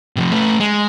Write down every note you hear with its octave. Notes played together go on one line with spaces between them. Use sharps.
C3 F3
A3 B4
G#3